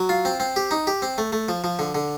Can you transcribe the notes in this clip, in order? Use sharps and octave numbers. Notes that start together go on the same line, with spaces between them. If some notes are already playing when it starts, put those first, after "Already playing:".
Already playing: F#3
F4
C4
C4
G4
D#4
G4
C4
A3
A3
F3
F3
D3
D3